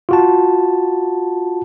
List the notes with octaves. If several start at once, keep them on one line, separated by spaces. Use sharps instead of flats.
F4 F#4 A5